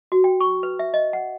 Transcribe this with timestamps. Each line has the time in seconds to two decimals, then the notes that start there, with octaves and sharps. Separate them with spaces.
0.12 F#4
0.24 G5
0.40 C#6
0.63 B4
0.79 E5
0.94 D#5
1.13 F#5